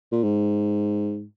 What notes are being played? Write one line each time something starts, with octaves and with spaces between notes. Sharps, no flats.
A#2
G#2